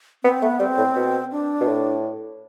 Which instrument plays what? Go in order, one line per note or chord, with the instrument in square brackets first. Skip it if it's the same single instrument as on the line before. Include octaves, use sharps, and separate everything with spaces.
[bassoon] B3 [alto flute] C4
[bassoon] A3 [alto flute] B3
[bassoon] G3 [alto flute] C4
[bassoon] A2
B2
[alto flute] D4
[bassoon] B2
A2